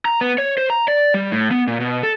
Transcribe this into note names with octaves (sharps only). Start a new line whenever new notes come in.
A#5
B3
C#5
C5
A#5
D5
G3
A2
B3
A#2
B2
A4